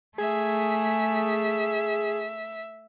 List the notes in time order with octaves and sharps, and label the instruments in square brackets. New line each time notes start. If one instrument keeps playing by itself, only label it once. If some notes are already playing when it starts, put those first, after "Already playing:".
[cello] A3 [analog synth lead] G#4 [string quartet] E5